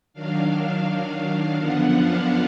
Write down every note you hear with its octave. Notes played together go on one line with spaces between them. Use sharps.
D#3 F#3 D4 F5
F#2 D3 F3 B3 D4 F#5
F5